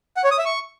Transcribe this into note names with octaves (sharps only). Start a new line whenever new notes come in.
F#5
C#5
D#6
E5
C#6